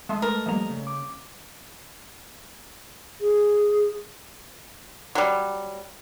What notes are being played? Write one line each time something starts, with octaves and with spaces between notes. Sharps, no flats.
G#3 A3 E5 A5 C6 D#6
A3 A#4 B4 A5
F3 G3 A#3 D#5 A#5
C#3
D6
G#4
F#3 G3